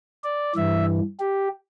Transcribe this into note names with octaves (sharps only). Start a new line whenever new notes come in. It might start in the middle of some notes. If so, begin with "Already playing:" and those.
D5
G2 E3 E5
G4